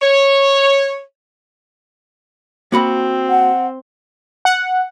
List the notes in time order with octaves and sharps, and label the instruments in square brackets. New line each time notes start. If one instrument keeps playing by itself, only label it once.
[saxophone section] C#5
[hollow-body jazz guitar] A#3 F#4 B5 [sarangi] C4
[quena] F#5
[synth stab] F#5